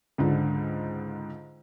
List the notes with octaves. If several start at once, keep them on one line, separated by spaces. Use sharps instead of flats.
C#2 G#2 D3